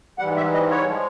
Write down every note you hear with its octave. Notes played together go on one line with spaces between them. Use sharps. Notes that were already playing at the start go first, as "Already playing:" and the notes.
G#2 E3 G3 F#5
E5
D#5
C#5
F3 G#3